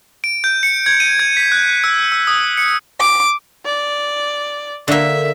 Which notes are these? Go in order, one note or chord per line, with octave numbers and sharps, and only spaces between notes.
D7
G6
C#7
G#6
D#7
G#6
B6
F#6
E6
E6
D#6
C#7
D6
D5
D3 A#3 E5